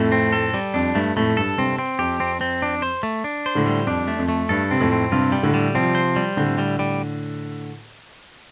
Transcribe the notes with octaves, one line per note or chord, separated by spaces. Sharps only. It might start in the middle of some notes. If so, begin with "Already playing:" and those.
Already playing: F2 A2 A3
C4
A4
G3
F2 D4
G2 A3
F2 A2 A3
G2 A4
G2 C3 C4
C4
F2 G4
C4
C4
D4
C5
A3
D4
C5
A2 D3
G3
F2 D4
A3
F2
A3
G2 A4
C3 C4
F2 A2
C4
G2 C3 F4
G3
A2 D3
G3
C3 F3 C4
C5
G3
A2 D3 C4
G3
G3